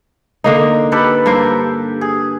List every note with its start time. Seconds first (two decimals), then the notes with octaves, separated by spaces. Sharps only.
0.44 D3 A#3 D#4
0.92 G4 A4 B4
1.26 G2 A#3 C5
2.01 G#4